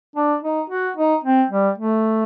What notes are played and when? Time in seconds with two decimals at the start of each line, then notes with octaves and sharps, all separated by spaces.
0.16 D4
0.43 D#4
0.70 F#4
0.97 D#4
1.24 C4
1.50 G3
1.78 A3